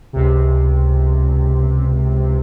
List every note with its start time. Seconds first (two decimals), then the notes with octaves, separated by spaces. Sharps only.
0.13 C#2 C3